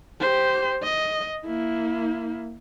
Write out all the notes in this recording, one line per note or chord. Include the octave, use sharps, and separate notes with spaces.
G4 C5
D#5
A#3 E4